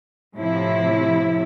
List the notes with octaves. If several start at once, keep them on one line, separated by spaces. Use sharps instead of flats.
A2 C3 F3 E4